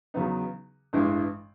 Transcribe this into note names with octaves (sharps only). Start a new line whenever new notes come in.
E2 C#3 F#3 B3 D#4
A1 G2 E3 G#3